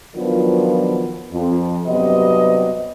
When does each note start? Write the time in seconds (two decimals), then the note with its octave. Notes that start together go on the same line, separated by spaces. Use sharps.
0.15 D#3 F3 F#3 B3 D4 F4
1.32 F2
1.87 G2 C3 F#3 B3 C4 D#5